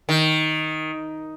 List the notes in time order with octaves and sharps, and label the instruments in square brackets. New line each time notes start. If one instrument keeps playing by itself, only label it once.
[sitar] D#3